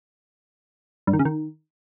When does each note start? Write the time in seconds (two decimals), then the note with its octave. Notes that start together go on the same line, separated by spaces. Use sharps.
1.07 G2
1.13 D#3
1.19 C#3
1.25 D#3